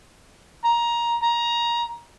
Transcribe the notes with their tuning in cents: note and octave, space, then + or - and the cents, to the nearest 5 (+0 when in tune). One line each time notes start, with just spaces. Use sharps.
A#5 +15
A#5 +20